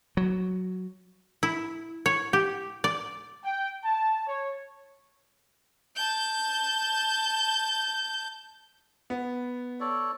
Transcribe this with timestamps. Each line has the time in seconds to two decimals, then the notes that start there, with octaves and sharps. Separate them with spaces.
0.17 F#3
1.43 E4
2.06 C#5
2.33 G4
2.84 D5
3.44 G5
3.84 A5
4.27 C#5
5.96 A5 G6
9.10 B3
9.80 A4 C#5 D5